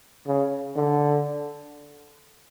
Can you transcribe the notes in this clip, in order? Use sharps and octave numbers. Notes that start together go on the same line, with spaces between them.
C#3
D3